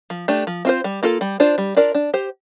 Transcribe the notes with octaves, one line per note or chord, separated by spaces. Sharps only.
F3
A3 D4 G4
F3
C4 F4 C5
G3
A#3 F4 A4
G3
D4 F4 C5
G3
D4 F4 A#4 D5
D4
G4 C5